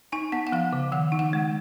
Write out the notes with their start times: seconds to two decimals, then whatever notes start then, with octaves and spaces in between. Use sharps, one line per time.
0.12 D#4 G#5
0.32 B3 F#5
0.47 F#5
0.52 F3 F5
0.73 C#3
0.92 D#3 F#5
1.12 D#4
1.19 F#5
1.33 G#3